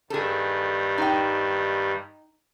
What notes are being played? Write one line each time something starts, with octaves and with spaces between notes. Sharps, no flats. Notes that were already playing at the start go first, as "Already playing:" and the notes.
G2 D#3 G3 G#4 A4
D#4 G5